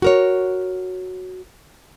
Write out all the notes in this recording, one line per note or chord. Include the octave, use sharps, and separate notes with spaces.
F#4 A#4 C#5